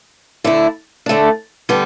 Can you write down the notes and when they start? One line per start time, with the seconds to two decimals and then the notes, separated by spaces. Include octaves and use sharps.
0.44 D3 A3 E4
1.06 D3 A3 D4
1.69 D3 G3 B3